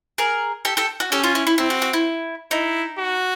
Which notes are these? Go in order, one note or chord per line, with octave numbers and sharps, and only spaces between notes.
G#4 A#4
G4 A4
G4 A4
F#4
C#4 G4 A4
F4
E4
E4
C4 E4
F#4
F#4
E4
D#4 E4
F#4